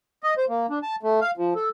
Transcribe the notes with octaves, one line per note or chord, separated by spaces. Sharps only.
D#5
C5
A#3
D4
A5
A3
F5
F3
A4